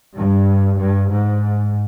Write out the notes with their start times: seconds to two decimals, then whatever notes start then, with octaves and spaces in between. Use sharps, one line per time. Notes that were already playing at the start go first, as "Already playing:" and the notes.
0.17 G2
0.79 G2
1.10 G#2